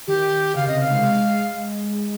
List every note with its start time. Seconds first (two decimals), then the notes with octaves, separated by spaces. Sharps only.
0.07 D#3 G4
0.55 C#3 F5
0.67 C3 D#5
0.79 D#3 F5
0.90 G#3
1.03 G#3